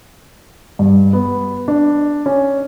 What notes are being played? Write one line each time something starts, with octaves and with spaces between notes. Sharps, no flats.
G2
B3
D4
C#4